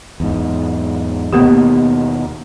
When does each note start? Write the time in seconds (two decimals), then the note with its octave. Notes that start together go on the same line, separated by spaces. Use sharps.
0.20 E2 G#2
1.33 D#2 B2 A#3 B3 G4